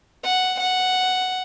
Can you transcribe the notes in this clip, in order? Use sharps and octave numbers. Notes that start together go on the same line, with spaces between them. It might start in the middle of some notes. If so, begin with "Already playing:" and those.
F#5
F#5